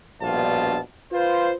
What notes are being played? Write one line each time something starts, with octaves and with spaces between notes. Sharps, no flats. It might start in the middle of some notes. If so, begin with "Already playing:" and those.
A#1 G2 B2 F4 A5
F4 B4 C5